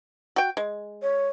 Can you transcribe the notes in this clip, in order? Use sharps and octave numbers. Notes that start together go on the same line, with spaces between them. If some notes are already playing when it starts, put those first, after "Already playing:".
F#4 G5
G#3
C#5